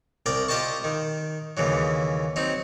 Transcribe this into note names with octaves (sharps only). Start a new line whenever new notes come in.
C2 A#4 D5 G5
F4 G4 D#5 G5 A5 C#6
D#3
D#2 C#3 E3 F#3
F#3 C4 D#4